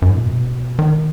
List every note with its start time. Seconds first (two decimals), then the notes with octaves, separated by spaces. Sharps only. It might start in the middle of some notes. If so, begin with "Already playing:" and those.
0.02 F#2
0.09 G#2
0.16 A#2
0.25 B2
0.79 D#3